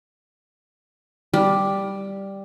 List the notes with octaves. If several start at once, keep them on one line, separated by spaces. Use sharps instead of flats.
G3